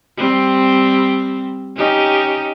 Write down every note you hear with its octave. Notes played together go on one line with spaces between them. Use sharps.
G3 C4
C#4 D#4 G4